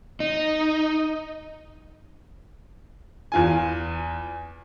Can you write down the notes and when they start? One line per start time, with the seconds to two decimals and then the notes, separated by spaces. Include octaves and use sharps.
0.20 D#4
3.32 E2 F4 G#5